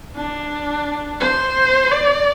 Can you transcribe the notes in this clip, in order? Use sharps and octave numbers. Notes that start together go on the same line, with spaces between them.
D4
C5
D5